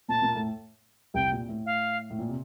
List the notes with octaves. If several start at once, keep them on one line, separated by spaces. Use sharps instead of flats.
A#2 A#3 A5
A#2 A#3
A2 A3
C2 C3 G5
A#2
A2
F5
A2
A#2
C3